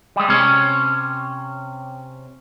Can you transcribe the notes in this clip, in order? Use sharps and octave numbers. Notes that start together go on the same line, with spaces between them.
G3 G#3
C3 C#4